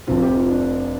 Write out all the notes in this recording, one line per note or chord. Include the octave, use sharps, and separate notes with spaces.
F1 F2 C3 F3 F4
G4
F4
D4